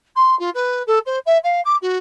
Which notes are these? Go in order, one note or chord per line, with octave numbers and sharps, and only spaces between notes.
C6
F4
B4
A4
C5
E5
F5
D6
F#4